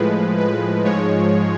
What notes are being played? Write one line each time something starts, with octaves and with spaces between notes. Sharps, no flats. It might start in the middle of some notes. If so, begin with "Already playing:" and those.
Already playing: A2 F3 G#3 B4
B4
G#2 F3 G#3 C#5